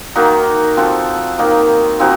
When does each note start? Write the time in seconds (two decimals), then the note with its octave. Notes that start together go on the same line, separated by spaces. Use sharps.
0.15 D#3 A#3 D#4 F#4
0.77 F3 C4 F#4 A4
1.38 D#3 A#3 D#4
1.99 F3 C4 D#4 F#4